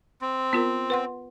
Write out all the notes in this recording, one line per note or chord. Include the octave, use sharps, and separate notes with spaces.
C4
B3 F4 A#4
B4 F#5 C6